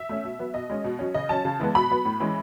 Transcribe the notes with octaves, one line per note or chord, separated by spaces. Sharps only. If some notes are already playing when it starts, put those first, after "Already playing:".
Already playing: E5
A3 C#4
B2
F#3 B3
B2 D#5
G#3 C#4
B2
F#3 C#4
C#3 D#5
F#3 C#4 A5
C#3
E3 G#3 B3
B2 B5
F#3 B3
A2
E3 G#3 C#4